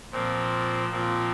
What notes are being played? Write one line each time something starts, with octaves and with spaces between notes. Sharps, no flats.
A#2 F3 C4
A#2 F3 C4